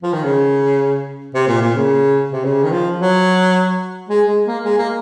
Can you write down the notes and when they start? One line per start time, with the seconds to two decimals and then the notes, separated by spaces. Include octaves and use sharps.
0.03 F3
0.13 D#3
0.24 C#3
1.34 C3
1.48 A#2
1.61 A#2
1.75 C#3
2.32 C3
2.44 C#3
2.64 D#3
2.72 F3
2.99 F#3
4.09 G#3
4.28 G#3
4.46 A#3
4.64 G#3
4.78 A#3